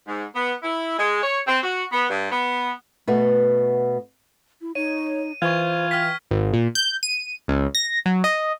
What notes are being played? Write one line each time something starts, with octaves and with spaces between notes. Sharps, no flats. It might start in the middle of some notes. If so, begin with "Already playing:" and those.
G#2
B3
E4
G#3
C#5
C4
F#4
B3
G2
B3
B2 A3 B3
E4
D#4 C#5 D#7
E3 F4 C5 C#6 G#6
G5 F6 G#6 B6
G#1
A#2
G6
D#7
C#2
A#6
F#3
D#5